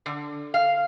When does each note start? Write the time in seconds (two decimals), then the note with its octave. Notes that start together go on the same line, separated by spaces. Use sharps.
0.06 D3
0.54 F5